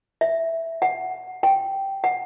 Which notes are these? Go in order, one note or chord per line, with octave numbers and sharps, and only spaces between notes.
E5
F#5
G5
F#5